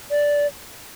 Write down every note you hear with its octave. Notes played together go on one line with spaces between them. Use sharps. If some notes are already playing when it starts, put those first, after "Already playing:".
D5